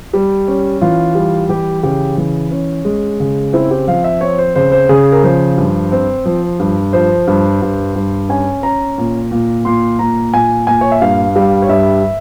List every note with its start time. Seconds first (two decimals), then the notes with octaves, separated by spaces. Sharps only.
0.14 G3
0.48 C#4
0.81 E3 F4
1.15 G3
1.49 E3 G4
1.83 C#3 G4
2.17 E3
2.51 C#4
2.85 G#3
3.20 C#3
3.53 C4 E4
3.71 G4
3.87 F3 F5
4.04 E5
4.21 C4 C#5
4.38 C5
4.55 C#3 C5
4.72 C5
4.89 C#3 G#4
5.12 A#4
5.23 F3 C5
5.58 G2
5.92 C4
6.25 F3
6.60 G2
6.93 F3 C5
7.27 G2
7.62 G2
7.96 G2
8.29 C#4 G#5
8.63 C#4 A#5
8.98 A#2
9.32 A#2
9.65 A#2 C6
9.99 A#2 A#5
10.33 A#2 G#5
10.67 A#2 G#5
10.81 C#5
10.92 E5
11.01 G2 F5
11.36 G3 F5
11.62 C#5
11.69 G2 E5